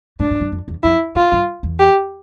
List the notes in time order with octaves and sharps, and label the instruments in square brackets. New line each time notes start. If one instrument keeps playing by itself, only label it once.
[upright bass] A2 [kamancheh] D4
[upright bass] A2
G2
F2
E2
[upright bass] F2 [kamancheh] E4
[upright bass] A2 [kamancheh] F4
[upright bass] G2
E2
[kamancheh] G4